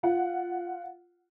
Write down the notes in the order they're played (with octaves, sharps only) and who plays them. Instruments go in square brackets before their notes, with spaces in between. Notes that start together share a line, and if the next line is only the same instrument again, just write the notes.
[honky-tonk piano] F4 F#5